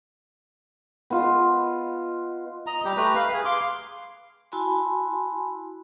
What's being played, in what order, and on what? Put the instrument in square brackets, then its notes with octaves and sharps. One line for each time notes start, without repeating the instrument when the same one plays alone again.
[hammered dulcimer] B3 F4 D#5
[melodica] D#5 A#5
G3 G4
A3 G4 B4 A#5
B4 F5
G#4
F5 C6 D6
[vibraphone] E4 F#4 G#5 A5 B5 C6